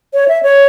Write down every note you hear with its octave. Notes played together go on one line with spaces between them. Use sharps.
C#5
E5
C#5